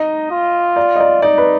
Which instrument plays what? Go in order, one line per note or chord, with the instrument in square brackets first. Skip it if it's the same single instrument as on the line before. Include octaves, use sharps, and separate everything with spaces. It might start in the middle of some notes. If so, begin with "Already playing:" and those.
Already playing: [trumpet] D#4 [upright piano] D#5
[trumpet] F4
[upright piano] D5
D#5
D5
[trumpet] D#4 [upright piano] D5
[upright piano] B4